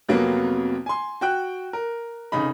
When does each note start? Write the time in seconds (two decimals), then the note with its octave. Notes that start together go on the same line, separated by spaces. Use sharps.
0.09 F2 C3 F#3 A#3 B3
0.86 G#5 C6
1.21 F#4 G5 F#6
1.73 A#4
2.32 F1 C#3 D#4 B5